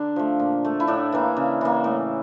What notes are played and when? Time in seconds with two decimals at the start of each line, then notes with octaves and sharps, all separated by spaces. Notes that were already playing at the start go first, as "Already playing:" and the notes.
Already playing: D3 D4
0.16 F3 A3
0.40 A#2
0.65 A3
0.80 E4
0.88 A2 D4
1.13 E3 A#3
1.37 C#3
1.61 E3 A#3
1.84 A2